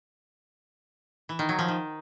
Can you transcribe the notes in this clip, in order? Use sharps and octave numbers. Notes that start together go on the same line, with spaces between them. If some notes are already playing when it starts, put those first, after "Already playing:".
E3
D#3
F#3
F3
D#3